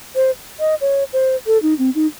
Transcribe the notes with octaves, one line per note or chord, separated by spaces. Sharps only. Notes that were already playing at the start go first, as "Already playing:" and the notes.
C5
D#5
C#5
C5
A4
D#4
C4
D#4